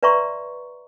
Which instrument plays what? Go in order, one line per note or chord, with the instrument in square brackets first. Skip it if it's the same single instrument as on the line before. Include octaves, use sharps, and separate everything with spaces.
[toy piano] B4 D5 E5 A#5 C6 C#6